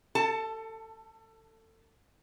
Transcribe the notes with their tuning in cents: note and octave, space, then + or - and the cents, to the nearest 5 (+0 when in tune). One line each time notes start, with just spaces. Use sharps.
A4 +25 A5 +0